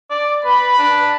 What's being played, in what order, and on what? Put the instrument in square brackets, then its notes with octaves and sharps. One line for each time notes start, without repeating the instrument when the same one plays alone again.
[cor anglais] D5
[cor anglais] B4 [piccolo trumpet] B5
[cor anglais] D4